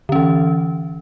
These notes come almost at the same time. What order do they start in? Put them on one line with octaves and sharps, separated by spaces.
D3 C#4 E3